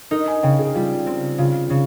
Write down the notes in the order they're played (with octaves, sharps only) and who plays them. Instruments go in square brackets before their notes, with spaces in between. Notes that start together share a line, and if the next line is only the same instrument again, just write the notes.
[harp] D#4 [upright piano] A#4
[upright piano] G#5
[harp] C#3 [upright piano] G5
[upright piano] G#4
[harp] G3 [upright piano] F4
[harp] C4
[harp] C#3 [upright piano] F4
[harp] C#3